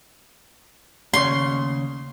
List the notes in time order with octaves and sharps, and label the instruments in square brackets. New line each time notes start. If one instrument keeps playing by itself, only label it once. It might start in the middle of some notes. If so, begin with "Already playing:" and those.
[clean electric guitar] D#2 C#3 C#5 [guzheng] C6